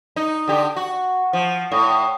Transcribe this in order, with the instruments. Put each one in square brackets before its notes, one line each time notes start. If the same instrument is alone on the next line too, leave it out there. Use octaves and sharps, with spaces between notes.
[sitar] D#4
D3 G4
F#4
F3
A2